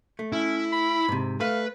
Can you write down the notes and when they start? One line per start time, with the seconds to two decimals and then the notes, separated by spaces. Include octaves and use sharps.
0.19 A3
0.33 C#4 E4
0.72 B5
1.08 G#2 C3
1.41 A3 B4 F5